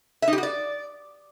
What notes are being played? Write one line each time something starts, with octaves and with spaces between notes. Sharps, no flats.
E5
D#4
G4
F#4
D5